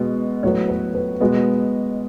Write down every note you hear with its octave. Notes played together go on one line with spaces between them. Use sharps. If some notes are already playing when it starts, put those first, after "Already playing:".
Already playing: B2 G#3 B3
A2 F#3 B3 C#5
B4
B4
B2 G#3 B3 D#5